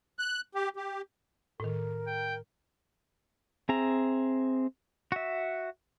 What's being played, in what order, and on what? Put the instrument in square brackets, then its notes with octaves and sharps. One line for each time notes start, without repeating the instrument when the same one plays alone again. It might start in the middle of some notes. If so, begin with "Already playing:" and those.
[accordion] F#6
G4
G4
[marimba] A2 D#3 [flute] A#4
[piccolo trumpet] G5
[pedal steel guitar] C4 G#4 E5 A#5
F#4 E5